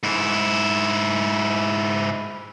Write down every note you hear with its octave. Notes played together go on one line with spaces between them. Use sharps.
G#2 E4